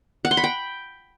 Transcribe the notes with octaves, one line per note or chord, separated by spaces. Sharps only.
F#5
C6
B5
G5